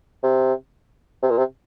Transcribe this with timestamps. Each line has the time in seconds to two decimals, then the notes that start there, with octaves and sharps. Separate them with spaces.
0.23 C3
1.23 C3
1.30 A#2
1.38 C3